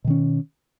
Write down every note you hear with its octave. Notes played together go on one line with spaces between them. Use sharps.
B2 D#3 C#4